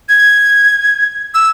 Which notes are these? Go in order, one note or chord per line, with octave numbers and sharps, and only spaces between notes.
G#6
E6